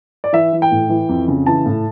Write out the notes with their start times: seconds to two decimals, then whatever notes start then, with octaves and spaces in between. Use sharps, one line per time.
0.24 D5
0.33 E3 E5
0.53 E3
0.62 G5
0.71 A2
0.89 E3
1.09 F2
1.28 C#3
1.46 E3 A5
1.66 A2